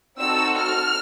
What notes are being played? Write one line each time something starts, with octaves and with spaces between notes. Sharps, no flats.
C4 D#4 F#4 A4 E6
F6